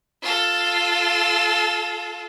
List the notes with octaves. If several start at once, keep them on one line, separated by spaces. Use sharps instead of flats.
F4 A4